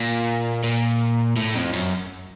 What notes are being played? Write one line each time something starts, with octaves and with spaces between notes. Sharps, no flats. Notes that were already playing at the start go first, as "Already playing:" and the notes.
Already playing: A#2
A#2
A2
F2
F#2